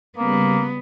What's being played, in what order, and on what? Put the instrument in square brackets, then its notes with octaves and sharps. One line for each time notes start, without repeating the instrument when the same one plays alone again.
[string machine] C#3 G3 [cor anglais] A#3 [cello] B3